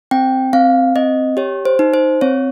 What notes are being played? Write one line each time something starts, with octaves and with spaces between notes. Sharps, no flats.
C4 G5
C4 F5
C4 D#5
G4 C#5
C5
D#4
C5
C4 C#5